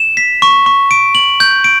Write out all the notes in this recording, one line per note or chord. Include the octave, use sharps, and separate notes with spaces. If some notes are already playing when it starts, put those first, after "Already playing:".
Already playing: E7
B6
C#6
C#6
D7
F#7
G6
D7